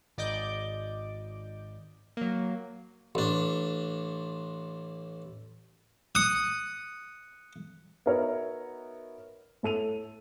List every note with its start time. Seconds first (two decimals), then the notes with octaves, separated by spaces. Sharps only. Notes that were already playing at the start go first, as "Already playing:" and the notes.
0.18 G#1 D5 D#5 D6 G6
2.17 F#3 A#3
3.15 A1 D4
6.15 D#6 F#6 C#7
8.06 B3 D#4 F#4 A#4 C#5 E5
9.63 A2 A4 D#7 F7